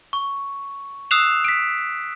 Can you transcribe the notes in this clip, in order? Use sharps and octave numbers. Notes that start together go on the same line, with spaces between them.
C#6
D#6 E6 F#6 C7 E7 F7
B6 D7